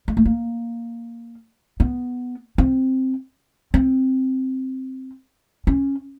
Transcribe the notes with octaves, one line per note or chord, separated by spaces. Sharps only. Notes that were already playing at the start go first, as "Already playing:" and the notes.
G#3
A3
A#3
B3
C4
C4
C#4